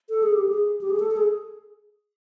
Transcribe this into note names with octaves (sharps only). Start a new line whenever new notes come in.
A4
G#4
G4
G#4
G4
G#4
A4
A4
G#4